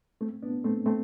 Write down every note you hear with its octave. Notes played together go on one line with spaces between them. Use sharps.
A3 C4
B3 D4
A3 C4
A3 C4